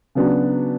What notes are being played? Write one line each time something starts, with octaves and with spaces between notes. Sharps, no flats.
C#3 F#3 B3 D4 F#4